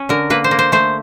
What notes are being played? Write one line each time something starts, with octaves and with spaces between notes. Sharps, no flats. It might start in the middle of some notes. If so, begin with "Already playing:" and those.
Already playing: C#4
D3 A#4
A#3 B4
C5
A#3
C5
A3 C5